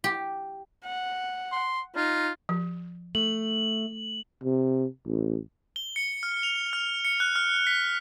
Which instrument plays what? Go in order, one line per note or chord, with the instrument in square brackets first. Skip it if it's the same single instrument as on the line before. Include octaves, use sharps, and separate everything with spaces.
[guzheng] G4
[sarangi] F#5
[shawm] C6
[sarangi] D#4 [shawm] F4
[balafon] F3
[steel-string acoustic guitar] A3 [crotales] F#7
[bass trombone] C3
A1
[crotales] G7
C#7
F6
F7
F6
C#7
F#6
F6
B6